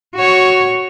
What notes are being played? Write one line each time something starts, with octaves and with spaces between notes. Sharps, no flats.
F#4 C#5